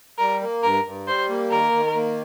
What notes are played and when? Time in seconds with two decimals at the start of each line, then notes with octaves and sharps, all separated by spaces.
0.18 G3 A#4
0.41 A#3
0.63 G2 A#4
0.84 G2
1.07 G3 C5
1.29 A#3
1.51 D#3 A#4
1.72 D#3
1.95 A#3